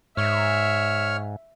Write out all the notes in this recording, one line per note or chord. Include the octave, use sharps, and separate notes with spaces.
G#2 C#5 E5 F6